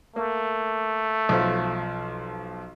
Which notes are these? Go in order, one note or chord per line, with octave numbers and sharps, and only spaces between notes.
A3 A#3
B1 F3